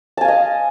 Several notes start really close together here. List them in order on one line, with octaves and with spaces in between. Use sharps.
A5 G#5 F5 D#5